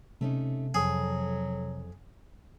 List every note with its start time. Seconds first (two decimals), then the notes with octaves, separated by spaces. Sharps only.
0.21 C3 A3 C#4 D#4
0.74 F2 F#3 G#4 A4 G5